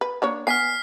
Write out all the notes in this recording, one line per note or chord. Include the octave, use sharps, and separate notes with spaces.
B4
A#3 D4 C#5
B3 G#5 F6 B6 C7